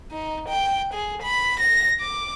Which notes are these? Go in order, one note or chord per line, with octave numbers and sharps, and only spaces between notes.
D#4
G5
G#4
B5
A#6
D6